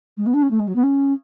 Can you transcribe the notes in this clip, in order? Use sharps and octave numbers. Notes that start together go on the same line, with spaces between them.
G#3
B3
D4
C#4
A3
G#3
F#3
B3
C#4